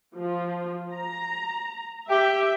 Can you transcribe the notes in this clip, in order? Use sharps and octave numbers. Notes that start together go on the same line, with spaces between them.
F3
A#5
G4 E5